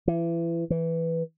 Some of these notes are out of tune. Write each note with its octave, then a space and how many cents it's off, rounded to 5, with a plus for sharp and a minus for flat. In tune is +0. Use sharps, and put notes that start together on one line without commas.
E3 +30
E3 +0